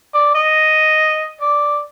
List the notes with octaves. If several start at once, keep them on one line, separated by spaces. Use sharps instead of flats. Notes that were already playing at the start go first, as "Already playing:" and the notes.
D5
D#5
D5